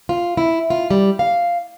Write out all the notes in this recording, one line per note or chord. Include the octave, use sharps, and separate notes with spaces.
F4
E4
F4
G3
F5